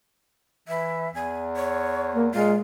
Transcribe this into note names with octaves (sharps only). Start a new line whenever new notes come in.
E3 E5
E2 G#5
C#5
A#3
A#2 G#3 F5